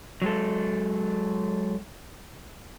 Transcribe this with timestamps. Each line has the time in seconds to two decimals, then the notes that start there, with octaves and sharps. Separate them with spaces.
0.22 F#3 G#3 A4